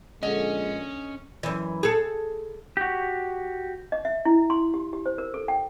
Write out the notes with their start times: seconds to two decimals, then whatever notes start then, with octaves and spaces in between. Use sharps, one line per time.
0.23 A#1 D3 G#3 C#4 D#5
1.43 F#2 E3
1.83 G#4 A4
2.77 F#4 G4
3.92 D#5
4.05 E5
4.25 E4
4.50 C6
4.74 G4
4.93 G4
5.06 C5
5.18 A#4
5.34 A4
5.48 G5